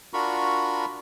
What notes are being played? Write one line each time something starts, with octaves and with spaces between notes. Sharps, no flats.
D4 F4 F#4 A#4 B5 C#6